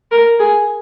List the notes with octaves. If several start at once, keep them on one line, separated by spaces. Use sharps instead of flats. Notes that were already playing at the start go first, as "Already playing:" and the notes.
A#4
G#4